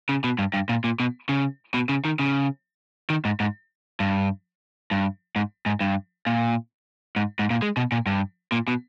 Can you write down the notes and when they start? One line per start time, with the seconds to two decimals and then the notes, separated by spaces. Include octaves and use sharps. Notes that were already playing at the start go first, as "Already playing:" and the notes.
0.09 C#3
0.24 B2
0.39 G2
0.54 G2
0.69 A#2
0.84 A#2
1.00 B2
1.29 C#3
1.74 B2
1.89 C#3
2.05 D#3
2.19 C#3
3.10 D#3
3.25 G#2
3.40 G#2
4.00 G2
4.91 G2
5.36 G#2
5.66 G#2
5.81 G2
6.26 A#2
7.16 G#2
7.39 G#2
7.50 A#2
7.62 G#3
7.77 B2
7.92 A#2
8.06 G2
8.52 A#2
8.68 B2